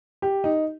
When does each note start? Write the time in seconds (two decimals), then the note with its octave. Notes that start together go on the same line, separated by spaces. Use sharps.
0.22 G4
0.44 D#4